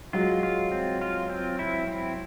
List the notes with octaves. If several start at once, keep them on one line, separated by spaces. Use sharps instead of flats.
F#3 G#3 F4
F4
C4
F4
C4
E4
C4